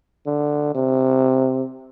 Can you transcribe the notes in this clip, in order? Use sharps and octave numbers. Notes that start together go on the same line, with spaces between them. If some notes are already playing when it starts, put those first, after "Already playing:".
D3
C3